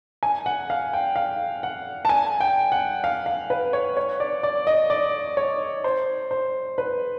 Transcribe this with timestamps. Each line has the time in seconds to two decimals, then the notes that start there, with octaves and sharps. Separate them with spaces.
0.23 G#5
0.46 F#5
0.70 F5
0.93 G5
1.16 F5
1.63 F#5
2.05 A5
2.09 G#5
2.40 G5
2.72 F#5
3.04 F5
3.26 F5
3.50 B4
3.73 C#5
3.97 C#5
4.20 D5
4.43 D5
4.67 D#5
4.90 D5
5.37 C#5
5.84 C5
6.31 C5
6.78 B4